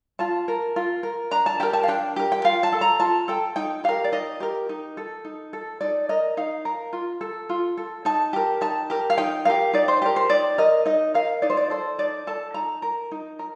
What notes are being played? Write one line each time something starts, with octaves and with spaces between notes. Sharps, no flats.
F4 A5
A#4
F4
A#4
D4 A#5
A5
G4 A#4 G5
A5
F5
D4 G5
G4 A#4
G5
F4 F5
A5
A4
A#5
F4 A5
A4 G5
D#4 G5
G4 A#4 F5
D5
D#4 D#5
G4 A#4
D#4
A4
D#4
A4
D#4 D5
A#4 D#5
D#4 F5
A#4
F4
A4
F4
A4
D#4 A5
G4 A#4
D#4 A5
G4 A#4
F5
D#4 G5
G4 A#4 F5
D#4 D5
C5
G4 A#4
C5
D#4 D5
A#4 D#5
D#4 D#5
A#4 F5
D#4 D5
C5
D5
A4 C5
D#4 D5
A4 A5
D#4 A#5
A#4
D#4
A#4